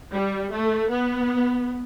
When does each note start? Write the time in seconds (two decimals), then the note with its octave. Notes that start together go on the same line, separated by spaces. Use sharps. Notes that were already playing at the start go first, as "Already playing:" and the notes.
0.12 G3
0.51 A3
0.89 B3